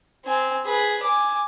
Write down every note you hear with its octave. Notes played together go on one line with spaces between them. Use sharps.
C4 G#5
G#4 B4
G#5 D6